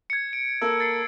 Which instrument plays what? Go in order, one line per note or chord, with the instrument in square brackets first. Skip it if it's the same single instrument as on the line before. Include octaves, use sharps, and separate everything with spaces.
[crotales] G#6 C#7
D7
[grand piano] A#3 A4 [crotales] E6
[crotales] A6 C7 C#7